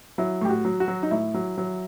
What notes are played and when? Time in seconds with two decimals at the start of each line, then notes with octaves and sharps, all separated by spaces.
0.18 F#3 E4
0.42 A2 G4
0.49 F#4
0.65 F#3
0.80 F#4
0.88 F#3
1.03 D#4
1.11 A2 E4
1.34 F#3
1.58 F#3